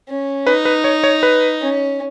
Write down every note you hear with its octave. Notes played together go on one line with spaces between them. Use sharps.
C#4
D#4 B4
B4
C#5
C#5
B4
C#4